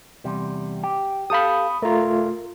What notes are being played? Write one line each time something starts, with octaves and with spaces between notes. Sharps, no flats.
E2 C3 G3
G4
G4 A4 F5 B5 D#6
A3 F4 A#4